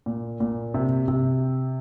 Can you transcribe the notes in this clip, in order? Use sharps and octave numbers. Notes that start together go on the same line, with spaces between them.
A#2
A#2
C3
C3